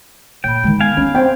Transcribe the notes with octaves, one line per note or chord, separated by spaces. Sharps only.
A#2 C#5 G5 B5
D#3 G#3
B3 F5 G#5
B3 C#4 D#4
C4 G5